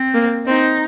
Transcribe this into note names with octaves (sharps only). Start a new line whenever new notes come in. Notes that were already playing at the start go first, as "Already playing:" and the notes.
Already playing: C4
A#3
C4 D#4